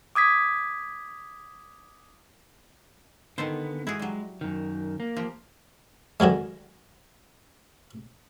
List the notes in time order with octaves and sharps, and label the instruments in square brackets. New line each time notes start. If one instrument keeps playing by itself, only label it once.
[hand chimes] D6 D#6 G#6 B6
[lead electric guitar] D3 B3 [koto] D#3 A4 C5
[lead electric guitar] G#3 [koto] E4 F#4 G#4
[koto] F#3 G3
[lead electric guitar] F#2 D#3
A#3
[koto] F3 G4
[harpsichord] D3 D#3 F#3 G#3